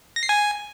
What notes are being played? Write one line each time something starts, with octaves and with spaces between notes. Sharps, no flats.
A#6
C7
G#5